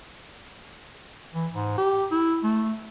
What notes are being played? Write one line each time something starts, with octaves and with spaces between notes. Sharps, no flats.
E3
G#2
G4
E4
A3